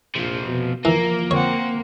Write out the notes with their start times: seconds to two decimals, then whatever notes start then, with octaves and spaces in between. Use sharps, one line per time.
0.15 A#1 C3 F3
0.48 B2
0.85 E3 F3 A#3 A#4
1.31 C4 C#5 F#5